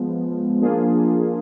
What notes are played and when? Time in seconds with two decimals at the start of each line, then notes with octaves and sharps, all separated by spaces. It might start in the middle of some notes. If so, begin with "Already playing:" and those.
Already playing: F3 G#3 B3
0.61 F3 A#3 D4 F4 G#4